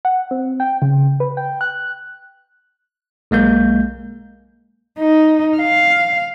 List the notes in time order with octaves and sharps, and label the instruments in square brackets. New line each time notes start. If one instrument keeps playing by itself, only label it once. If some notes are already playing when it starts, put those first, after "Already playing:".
[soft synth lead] F#5
C4
G5
C#3
B4
G5
F#6
[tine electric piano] B1 G#3 A#3 G6
[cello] D#4
F5